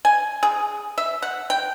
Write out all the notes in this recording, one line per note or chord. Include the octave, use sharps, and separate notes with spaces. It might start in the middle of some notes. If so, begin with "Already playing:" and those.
G#5
G#4
E5
F#5
G5